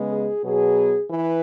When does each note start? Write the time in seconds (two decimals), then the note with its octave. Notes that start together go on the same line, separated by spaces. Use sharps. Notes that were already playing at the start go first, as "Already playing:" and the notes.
Already playing: C#3 G#3 B3
0.12 G#4
0.44 B2 F#3 B3 G#4
1.10 E3 B4